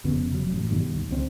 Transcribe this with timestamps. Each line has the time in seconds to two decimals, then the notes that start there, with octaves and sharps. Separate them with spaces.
0.04 F1 F2 C#3 B3
0.31 F1 F#3
0.52 A1
0.69 G2 B2 D#3 G3
0.95 D#2
1.09 C#2 F#3 C4